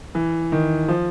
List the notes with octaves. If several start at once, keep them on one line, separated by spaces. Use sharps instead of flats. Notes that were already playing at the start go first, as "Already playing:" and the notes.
E3
D#3
F3